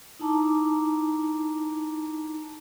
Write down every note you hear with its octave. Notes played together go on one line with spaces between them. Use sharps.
D#4 E4 A5 A#5 D6